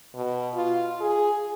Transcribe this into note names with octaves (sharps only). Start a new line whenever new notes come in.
B2
F4
G#4